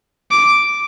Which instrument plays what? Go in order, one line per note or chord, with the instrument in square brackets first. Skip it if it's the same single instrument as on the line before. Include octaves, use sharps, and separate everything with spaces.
[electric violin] D6